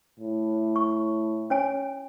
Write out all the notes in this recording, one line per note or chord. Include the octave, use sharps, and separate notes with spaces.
A2
C#6
C#4 C#5 G#5